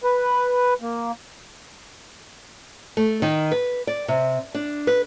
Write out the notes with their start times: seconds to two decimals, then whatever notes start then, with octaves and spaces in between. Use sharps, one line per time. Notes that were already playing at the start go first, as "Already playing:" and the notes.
0.04 B4
0.81 A#3
2.97 A3
3.22 D#3
3.52 B4
3.87 D5
4.08 C3
4.55 D4
4.87 B4